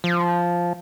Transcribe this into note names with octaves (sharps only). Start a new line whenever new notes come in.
F3